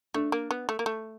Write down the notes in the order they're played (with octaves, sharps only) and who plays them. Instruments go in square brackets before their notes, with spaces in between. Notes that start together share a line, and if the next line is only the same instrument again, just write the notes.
[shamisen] A3 [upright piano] D4
[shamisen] A#3
B3
A3
A#3
A3